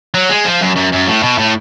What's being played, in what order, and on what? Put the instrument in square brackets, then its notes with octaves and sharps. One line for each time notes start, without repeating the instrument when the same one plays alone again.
[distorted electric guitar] F#3
G#3
F3
F#2
F#2
F#2
A2
B2
A2